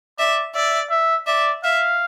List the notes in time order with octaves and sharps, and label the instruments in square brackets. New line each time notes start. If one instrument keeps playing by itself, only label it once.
[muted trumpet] D5 [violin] E5
[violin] D5 [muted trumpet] E5
[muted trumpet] E5
[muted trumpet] D5 [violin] E5
[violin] E5 [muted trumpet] F5